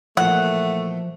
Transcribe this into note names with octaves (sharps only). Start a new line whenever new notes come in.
A#2 E3 F3 A3 F#5